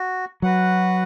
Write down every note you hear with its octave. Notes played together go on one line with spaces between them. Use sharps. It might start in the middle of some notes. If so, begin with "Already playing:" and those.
Already playing: F#4
F#3 F#4 B4 F#5